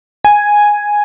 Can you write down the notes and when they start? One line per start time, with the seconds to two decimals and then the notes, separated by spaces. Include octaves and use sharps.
0.24 G#5